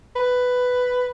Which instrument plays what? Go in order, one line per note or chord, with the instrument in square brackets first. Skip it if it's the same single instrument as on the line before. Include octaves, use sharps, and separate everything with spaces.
[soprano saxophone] B4